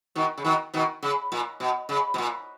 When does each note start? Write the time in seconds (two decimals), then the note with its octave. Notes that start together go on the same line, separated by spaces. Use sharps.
0.15 B2 D#3
0.38 C#3
0.44 B2 D#3
0.74 B2 D#3
1.03 C#3
1.32 A#2
1.60 B2
1.89 C#3
2.14 B2
2.18 A#2